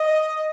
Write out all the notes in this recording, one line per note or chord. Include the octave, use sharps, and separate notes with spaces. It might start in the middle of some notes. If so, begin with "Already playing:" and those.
Already playing: D#5